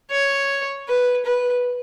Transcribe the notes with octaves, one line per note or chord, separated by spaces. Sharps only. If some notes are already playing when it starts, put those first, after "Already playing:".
C#5
B4
B4